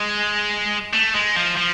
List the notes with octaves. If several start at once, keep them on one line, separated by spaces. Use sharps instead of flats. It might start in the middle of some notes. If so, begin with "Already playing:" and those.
Already playing: G#3
A3
G#3
F3
F3